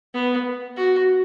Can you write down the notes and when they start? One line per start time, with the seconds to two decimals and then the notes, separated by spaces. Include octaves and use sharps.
0.14 B3
0.76 F#4